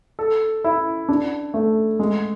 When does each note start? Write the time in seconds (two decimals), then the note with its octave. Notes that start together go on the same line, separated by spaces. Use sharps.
0.19 A4
0.64 E4
1.09 D4
1.54 A3
1.99 G#3